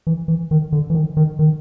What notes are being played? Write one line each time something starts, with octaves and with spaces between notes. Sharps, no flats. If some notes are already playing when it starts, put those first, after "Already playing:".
E3
E3
D#3
D3
E3
D#3
D#3
D#3